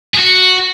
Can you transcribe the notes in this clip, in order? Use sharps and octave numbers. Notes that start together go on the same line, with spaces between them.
G#4
F#4